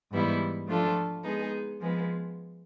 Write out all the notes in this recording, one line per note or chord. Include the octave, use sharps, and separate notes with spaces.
G#2 E3 G3 B3 E4
F3 A3 D4 F4 A4
G#3 B3 D#4 G#4
F3 G#3 B3